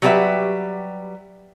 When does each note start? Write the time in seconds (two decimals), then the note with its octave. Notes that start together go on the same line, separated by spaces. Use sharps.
0.02 F#3 G3 G4 G#4 B4 E5